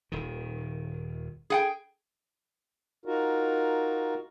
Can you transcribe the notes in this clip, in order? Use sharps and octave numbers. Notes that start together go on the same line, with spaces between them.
D#1 D#3
G#4 F#5 G5
D#4 F4 F#4 A#4